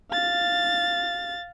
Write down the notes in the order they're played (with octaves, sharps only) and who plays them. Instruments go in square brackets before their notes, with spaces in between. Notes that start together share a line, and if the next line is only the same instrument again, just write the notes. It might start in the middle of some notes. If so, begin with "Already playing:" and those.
[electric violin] F5 A6